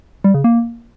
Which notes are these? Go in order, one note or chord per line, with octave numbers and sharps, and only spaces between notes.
G3
C#3
A#3